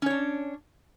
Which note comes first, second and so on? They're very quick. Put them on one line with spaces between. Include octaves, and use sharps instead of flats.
C#4 C#5 D4